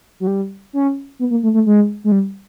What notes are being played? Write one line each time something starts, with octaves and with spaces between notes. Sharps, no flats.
F#3
G3
C#4
B3
A#3
A3
A3
G#3
G#3
G3